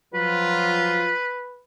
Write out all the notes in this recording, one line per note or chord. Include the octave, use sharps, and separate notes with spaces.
F3 F#3 F4 B4